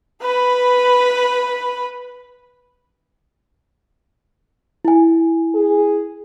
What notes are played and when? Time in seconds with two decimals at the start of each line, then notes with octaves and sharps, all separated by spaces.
0.21 B4 B5
4.85 E4 G#5
5.55 G#4